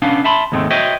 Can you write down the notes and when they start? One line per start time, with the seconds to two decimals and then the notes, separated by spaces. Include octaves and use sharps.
0.02 B3 C#4 D4 F5
0.24 E5 A5 B5 C6
0.52 D#2 G#2 G#3 A3 C4
0.70 F#4 C5 C#5 D#5 E5 G5